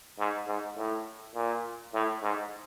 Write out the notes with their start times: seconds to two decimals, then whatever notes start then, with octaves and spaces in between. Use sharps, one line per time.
0.19 G#2
0.48 G#2
0.76 A2
1.35 A#2
1.94 A2
2.22 G#2